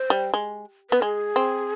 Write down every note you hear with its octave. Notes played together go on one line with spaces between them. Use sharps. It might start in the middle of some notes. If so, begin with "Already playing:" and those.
Already playing: C5
G3
G#3
B3 B4
G#3 G#4
C4